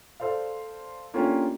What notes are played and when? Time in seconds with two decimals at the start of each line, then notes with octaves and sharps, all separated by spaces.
0.20 A4 C5 D5 F5
1.13 A3 A#3 C#4 D4 F4 G4